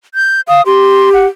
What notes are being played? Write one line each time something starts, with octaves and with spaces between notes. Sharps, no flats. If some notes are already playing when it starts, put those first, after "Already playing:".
G6
F5 D#6
G4 C6
F#5